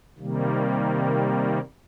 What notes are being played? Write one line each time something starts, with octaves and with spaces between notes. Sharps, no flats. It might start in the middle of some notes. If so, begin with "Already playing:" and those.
C3 D#3 G3 A#3